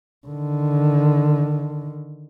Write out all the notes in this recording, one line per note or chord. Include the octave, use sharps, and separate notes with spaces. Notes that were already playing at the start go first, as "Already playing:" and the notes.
D3 D#3